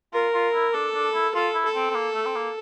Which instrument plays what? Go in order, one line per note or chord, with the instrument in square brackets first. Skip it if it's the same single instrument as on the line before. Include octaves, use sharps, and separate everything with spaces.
[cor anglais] F4 [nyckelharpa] A#4
[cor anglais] F4
E4
[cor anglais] D4 [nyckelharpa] A4
[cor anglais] D4
E4
[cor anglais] F4 [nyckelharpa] A4
[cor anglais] E4
[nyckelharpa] A4
[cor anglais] C4
C4
A#3
A3
C4
A#3